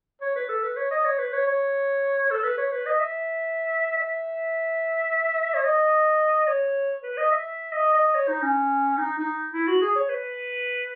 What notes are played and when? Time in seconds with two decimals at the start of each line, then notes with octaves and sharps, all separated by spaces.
0.22 C#5
0.36 B4
0.49 A4
0.63 B4
0.77 C#5
0.91 D#5
1.05 C#5
1.19 B4
1.33 C#5
1.47 C#5
2.31 A4
2.44 B4
2.58 C#5
2.72 B4
2.86 D#5
3.00 E5
3.97 E5
5.54 C#5
5.64 D#5
6.47 C#5
7.03 B4
7.17 D#5
7.31 E5
7.72 D#5
7.94 D#5
8.15 C#5
8.29 D#4
8.42 C#4
8.98 D#4
9.19 D#4
9.54 E4
9.68 F#4
9.81 G#4
9.95 C#5
10.09 B4